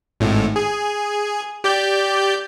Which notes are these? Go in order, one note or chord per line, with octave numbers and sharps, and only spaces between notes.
G#1 A2
G#4
G4 D5 G6